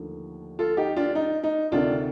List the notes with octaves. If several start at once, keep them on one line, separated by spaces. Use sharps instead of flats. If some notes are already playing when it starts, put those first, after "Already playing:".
Already playing: D#2 D3 F3 A3
F4 A4
D#4 G4
D4 F4
D#4
D#4
D2 C3 D#3 D4 F4